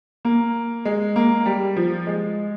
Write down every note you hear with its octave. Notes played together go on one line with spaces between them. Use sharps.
A#3
G#3
A#3
G3
F3
G#3